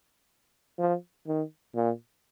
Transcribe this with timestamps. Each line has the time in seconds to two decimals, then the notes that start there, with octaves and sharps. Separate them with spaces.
0.79 F3
1.27 D#3
1.76 A#2